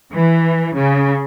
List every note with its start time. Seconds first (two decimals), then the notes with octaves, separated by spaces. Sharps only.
0.12 E3
0.76 C#3